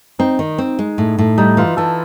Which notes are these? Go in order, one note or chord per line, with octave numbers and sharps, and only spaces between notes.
C4 D#4
D#3
C4
G#3
A2
A2
G3 D#4
E3 F4
E3 A4